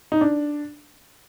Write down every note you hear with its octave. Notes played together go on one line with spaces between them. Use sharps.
D#4
D4